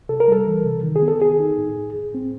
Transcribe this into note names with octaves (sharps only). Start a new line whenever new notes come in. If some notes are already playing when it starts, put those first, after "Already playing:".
C3 A4
A#4
G3 A4
E3
C3
D#3
G#4
B3
A4
D#3 G#4
D#4
A2
A2
A2
C4